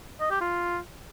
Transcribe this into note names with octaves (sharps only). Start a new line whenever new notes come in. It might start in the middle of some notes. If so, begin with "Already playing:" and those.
D#5
G4
F4